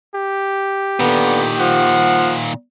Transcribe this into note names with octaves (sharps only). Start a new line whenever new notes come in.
G4
A#2 D3 D#3 B3
F3 F#5